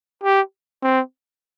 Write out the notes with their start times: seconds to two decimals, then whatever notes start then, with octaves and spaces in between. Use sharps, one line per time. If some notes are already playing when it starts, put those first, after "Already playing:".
0.24 G4
0.83 C4